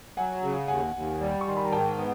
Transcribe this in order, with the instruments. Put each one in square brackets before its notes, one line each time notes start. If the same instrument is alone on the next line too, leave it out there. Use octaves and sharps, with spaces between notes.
[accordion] F#3 [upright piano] F#5 G#5
[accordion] C#3
[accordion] D#2 [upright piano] F#5 G#5
[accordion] D#2
G3
[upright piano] C#6
[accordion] D#3 [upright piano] C6
[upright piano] B5
A#5
[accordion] G#2 [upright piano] G5 A5
[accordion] B3